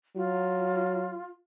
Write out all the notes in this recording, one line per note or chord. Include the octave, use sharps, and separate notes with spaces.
F#3 F4